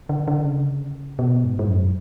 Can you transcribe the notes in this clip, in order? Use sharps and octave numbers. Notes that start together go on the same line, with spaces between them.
D3
D3
C#3
B2
G#2
G#2
F#2